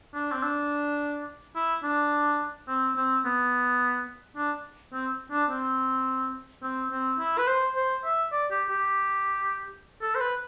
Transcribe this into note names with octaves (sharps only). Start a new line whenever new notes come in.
D4
C4
D4
E4
D4
C4
C4
B3
D4
C4
D4
C4
C4
C4
E4
B4
C5
C5
E5
D5
G4
G4
A4
C5
B4